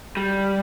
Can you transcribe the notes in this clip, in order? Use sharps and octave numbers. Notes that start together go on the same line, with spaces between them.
G3